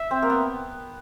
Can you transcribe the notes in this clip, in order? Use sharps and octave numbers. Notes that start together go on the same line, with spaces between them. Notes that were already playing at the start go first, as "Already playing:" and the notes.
Already playing: E5
C4
A#3
B3